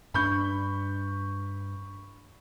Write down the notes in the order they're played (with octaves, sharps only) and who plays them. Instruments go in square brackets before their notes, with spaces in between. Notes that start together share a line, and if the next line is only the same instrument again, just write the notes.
[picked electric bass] G2 C4 D4 [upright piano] B5 C#6 G6